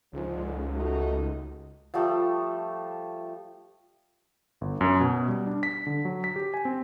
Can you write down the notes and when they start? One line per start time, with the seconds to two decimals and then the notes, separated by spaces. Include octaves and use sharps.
0.13 C#2 G#2 D3 F3
0.74 A3 D#4 F#4
1.94 F3 G3 A3
4.61 G1
4.81 F#2
5.00 B2
5.28 G3
5.46 D4
5.63 B6
5.87 D3
6.05 F#3
6.24 B6
6.36 G4
6.54 G#5
6.65 C4